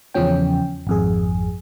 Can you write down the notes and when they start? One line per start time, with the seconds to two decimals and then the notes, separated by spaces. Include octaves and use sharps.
0.14 E2 C#3 F3 C#4 G5
0.87 G#1 F2 G#4